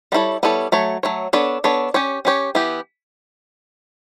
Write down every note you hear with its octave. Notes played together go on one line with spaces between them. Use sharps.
G3 B3 E4 A4 C#5
G3 B3 E4 A4 C#5
F#3 A3 C#5
F#3 A3 C#5
B3 D4 A4 C#5
B3 D4 A4 C#5
C#4 G4 C#5
C#4 G4 C#5
E3 B3 E4 G4